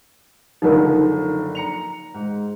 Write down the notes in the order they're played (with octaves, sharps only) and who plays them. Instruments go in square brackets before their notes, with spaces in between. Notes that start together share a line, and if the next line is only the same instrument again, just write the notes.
[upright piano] F#1 D3 F3 [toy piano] D#4 A#4
[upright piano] A#5 C#7 F7
G#2